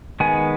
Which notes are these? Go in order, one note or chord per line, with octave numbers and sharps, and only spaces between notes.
D#3 G#3 B3 G#5